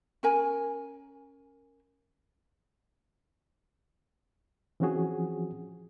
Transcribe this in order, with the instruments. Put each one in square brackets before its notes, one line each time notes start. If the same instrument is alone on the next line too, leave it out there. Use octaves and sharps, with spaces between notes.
[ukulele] C#4 A#4 G#5
[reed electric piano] E3 F3 C4 C#4 F#4 G#4